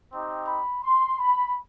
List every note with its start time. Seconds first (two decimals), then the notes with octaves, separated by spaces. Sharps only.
0.11 C4 D#4 G4
0.46 B5
0.83 C6
1.19 B5